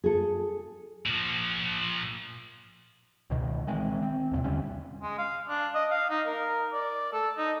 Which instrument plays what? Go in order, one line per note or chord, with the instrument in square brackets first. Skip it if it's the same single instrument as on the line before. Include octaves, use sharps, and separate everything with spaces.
[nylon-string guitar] G#4 A4
[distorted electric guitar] A#2 F3
[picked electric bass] C#2 B2 D#3
D#3 E3 G#3 C4
C4
D#2 G#2 C3
D#2 D3 G3 C#4
[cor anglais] G#3
F5
D4
D#5
F5
D#4
A#4
D5
A4
D#4